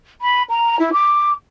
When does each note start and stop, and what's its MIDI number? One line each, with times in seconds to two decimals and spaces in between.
0.21 0.42 83
0.49 0.78 82
0.79 0.89 64
0.93 1.31 86